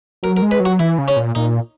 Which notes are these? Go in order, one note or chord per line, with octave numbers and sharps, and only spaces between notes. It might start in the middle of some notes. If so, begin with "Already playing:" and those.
F#3 A#4
A#4
G#3
B4
F#3
F#4
E3 E4
C#3
C#4
A#2
A#2 D#4